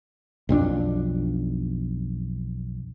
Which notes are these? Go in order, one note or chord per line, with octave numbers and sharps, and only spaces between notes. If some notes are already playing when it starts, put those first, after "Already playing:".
B1 F2 C4 D4